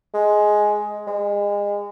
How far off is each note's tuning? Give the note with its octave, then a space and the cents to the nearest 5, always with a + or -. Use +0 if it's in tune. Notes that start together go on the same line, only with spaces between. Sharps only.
G#3 +10
G#3 -30